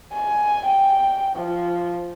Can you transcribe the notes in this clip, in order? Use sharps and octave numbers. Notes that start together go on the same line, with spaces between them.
G#5
G5
F3